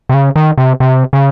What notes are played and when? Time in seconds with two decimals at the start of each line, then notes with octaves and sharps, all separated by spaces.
0.09 C3
0.14 C#3
0.36 D#3
0.58 C3
0.80 C3
1.13 C#3